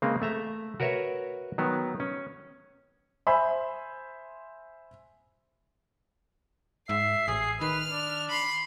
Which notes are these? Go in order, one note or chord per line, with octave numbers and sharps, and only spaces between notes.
C#3 G#3 A#3 C4
A3 E5 A#5
F#4 A#4 B4 C#5 E5
D#3 F#3 B3
C#4
C5 E5 G#5 B5 C6
G#2 E5 C7
A1 G#4
D#3 B4 F6
D4
B5 C6